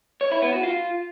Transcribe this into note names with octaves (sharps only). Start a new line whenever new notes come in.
C#5
E4
B3
F#4
F4